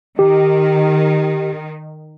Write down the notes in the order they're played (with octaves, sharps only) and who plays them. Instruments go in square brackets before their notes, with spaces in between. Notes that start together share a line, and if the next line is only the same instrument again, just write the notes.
[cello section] D#3 [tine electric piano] G4